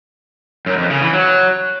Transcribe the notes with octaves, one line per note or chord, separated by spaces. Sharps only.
F#2
F2
C#3
E3
F#3